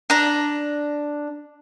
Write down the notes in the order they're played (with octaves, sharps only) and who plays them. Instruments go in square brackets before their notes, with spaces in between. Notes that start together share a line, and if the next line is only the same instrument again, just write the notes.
[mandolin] D4 A#5